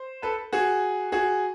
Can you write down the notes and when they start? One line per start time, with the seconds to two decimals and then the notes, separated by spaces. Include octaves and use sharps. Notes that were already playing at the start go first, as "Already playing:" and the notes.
Already playing: C5
0.22 A4 B4
0.53 F#4 G#4
1.12 F#4 G#4